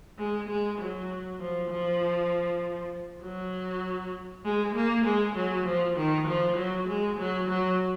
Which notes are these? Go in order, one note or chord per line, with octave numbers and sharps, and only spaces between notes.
G#3
G#3
F#3
F3
F3
F#3
G#3
A#3
G#3
F#3
F3
D#3
F3
F#3
G#3
F#3
F#3